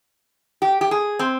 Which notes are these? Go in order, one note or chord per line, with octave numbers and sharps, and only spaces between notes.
G4
G4
G#4
C4